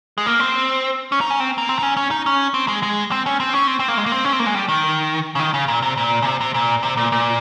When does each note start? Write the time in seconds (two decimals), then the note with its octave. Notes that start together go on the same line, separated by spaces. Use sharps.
0.18 G#3
0.26 A#3
0.40 C4
1.12 C#4
1.21 D#4
1.30 C#4
1.40 C4
1.58 A#3
1.69 C4
1.79 D#4
1.83 C#4
1.97 C#4
2.11 D#4
2.26 C#4
2.54 C4
2.68 G#3
2.83 G#3
3.11 C4
3.26 C#4
3.40 C4
3.54 C#4
3.67 C4
3.79 C4
3.88 A#3
3.98 G#3
4.06 A#3
4.12 C4
4.25 C#4
4.32 C4
4.40 A#3
4.46 G#3
4.55 G3
4.69 D#3
5.35 C#3
5.40 D#3
5.54 C#3
5.68 A#2
5.82 C3
5.98 A#2
6.22 C#3
6.26 C3
6.41 C3
6.54 A#2
6.83 C3
6.97 A#2
7.12 A#2